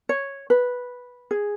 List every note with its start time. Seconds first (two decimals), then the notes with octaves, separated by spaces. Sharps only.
0.09 C#5
0.50 B4
1.31 G#4